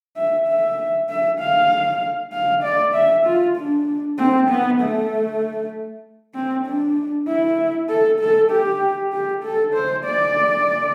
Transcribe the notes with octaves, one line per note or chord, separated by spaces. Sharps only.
E5
E5
E5
F5
F5
D5
E5
F4
D4
C4
B3
A3
C4
D4
E4
A4
A4
G4
G4
A4
C5
D5